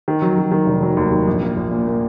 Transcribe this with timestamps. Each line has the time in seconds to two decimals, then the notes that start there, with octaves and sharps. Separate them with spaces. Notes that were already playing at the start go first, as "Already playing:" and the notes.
0.08 D#3
0.22 F#3
0.38 F#3
0.52 D#3
0.66 F1
0.82 F#3
0.97 D#2
1.11 D#3
1.27 A#1
1.42 A#3
1.57 A#1
1.71 A#2
1.87 A#2